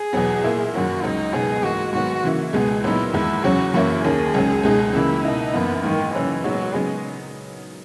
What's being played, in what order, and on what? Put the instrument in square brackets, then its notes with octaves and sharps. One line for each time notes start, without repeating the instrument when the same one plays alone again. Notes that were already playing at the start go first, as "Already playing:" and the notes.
Already playing: [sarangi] G#4
[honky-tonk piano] E2 B2 F#3 B3
A#2 A#3 E4
[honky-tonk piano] F#2 D#3 F#3 A#3 [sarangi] F#4
[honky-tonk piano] C#2 C#3 F#3 [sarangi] D#4
[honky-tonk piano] C#2 B2 F#3 B3 D#4 [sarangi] G#4
[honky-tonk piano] G#2 E3 A#3 [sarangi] F#4
[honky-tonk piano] G#2 D#3 F#3 B3 [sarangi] F#4
[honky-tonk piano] C#3 E3 A#3 E4
[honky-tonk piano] C#2 B2 G#3 B3 [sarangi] G#4
[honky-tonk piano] A#2 F#3 B3 D#4 [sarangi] E4
[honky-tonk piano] E2 D#3 G#3 [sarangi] E4
[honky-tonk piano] E2 C#3 F#3 C#4 [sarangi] F#4
[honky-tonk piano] F#2 E3 A#3 C#4 E4 [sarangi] F#4
[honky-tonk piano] D#2 D#3 A#3 C#4 [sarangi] G#4
[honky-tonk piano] C#2 C#3 F#3
C#2 B2 G#3 D#4
[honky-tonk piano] C#2 C#3 E3 A#3 [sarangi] E4
[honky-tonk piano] B2 A#3 E4 [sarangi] D#4
[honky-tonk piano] F#2 E3 A#3 E4 [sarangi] B3
[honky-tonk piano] G#2 E3 A#3 D#4 [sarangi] D#3
[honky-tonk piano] C#3 F#3 C#4 [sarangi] E3
[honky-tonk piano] A#2 G#3 B3 D#4 [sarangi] F#3
[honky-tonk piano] C#3 F#3 B3 D#4 [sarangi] G#3